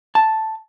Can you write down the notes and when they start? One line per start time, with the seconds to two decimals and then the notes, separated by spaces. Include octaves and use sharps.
0.15 A5